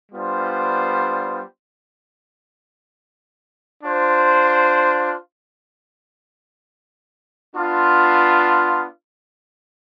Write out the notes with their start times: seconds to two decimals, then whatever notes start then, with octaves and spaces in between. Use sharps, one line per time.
0.12 G3 B3 D4 F4 C5
3.84 D4 F4 C5
7.55 B3 D4 F4